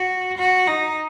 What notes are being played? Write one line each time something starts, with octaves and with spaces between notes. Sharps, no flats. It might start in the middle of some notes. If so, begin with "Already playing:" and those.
Already playing: F#4
F#4
D#4